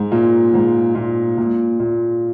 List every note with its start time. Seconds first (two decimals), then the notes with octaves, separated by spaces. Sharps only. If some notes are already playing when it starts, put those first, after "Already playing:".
Already playing: G#2
0.12 A#2
0.54 G#2
0.95 A#2
1.38 A#2
1.80 A#2